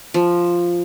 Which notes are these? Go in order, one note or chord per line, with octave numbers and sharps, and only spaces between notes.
F3